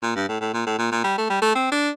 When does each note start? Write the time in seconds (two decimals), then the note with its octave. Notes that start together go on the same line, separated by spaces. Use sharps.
0.03 A#2
0.16 G2
0.29 A2
0.41 A2
0.54 A#2
0.67 A2
0.79 A#2
0.92 A#2
1.04 G3
1.18 A3
1.30 G3
1.42 A3
1.55 C4
1.72 D4